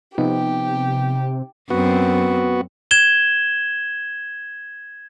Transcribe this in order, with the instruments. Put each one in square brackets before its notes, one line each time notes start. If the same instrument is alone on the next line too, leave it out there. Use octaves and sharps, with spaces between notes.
[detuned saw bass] C3 [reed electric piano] F3 B3 [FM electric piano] D#4 [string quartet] G4
[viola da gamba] F#2 C4 [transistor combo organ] B3 F#4
[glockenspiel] G#6 E7 G7